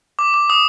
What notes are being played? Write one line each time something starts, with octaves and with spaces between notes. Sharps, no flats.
D6
D6
D#6